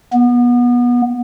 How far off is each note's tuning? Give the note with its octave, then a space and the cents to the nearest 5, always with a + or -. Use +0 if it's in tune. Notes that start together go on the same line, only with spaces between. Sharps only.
B3 -25